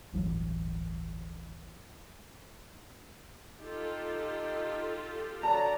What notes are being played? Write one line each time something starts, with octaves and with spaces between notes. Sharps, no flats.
D1 G1 E3 F#3
D#4 F4 G4 A4
D3 F#3 D5 A5 A#5